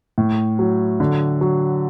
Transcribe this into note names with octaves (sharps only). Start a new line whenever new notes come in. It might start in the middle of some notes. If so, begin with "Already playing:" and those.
A2
F#3
D3
F#3